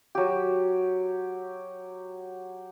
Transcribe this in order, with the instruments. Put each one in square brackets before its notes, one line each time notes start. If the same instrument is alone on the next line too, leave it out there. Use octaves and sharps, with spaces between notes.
[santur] F#3 G4